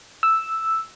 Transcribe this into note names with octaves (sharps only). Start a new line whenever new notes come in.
E6